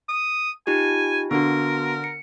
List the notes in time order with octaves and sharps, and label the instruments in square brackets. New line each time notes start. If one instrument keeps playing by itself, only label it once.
[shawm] D#6
[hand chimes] D#4 F4 G4 [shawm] G#5
[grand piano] D3 [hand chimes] B3 F#4 [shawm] A#4
[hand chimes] C#7